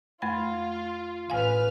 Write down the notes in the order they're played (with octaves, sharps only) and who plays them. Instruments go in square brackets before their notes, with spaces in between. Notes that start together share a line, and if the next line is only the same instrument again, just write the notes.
[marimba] F2 A3 B5 [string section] F4
[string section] A1 B4 F6 [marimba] F5 G#5